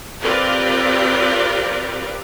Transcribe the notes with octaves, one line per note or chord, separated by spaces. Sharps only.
C4 F4 G4 A#4 B4 D5